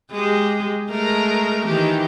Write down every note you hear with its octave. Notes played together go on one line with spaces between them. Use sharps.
G#3 G4
G#3 A3 A#4
D#3 E3 G4